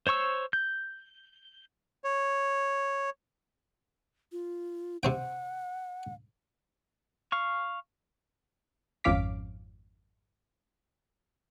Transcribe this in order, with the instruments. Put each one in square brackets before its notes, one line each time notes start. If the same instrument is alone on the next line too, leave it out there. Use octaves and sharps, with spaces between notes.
[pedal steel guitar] C5 C#5 C#6 E6
G6
[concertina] C#5
[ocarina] F4
[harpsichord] C3 C4 G5 [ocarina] F#5
[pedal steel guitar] F5 C#6
[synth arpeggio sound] G#1 F2 C#4 F5 D6 B6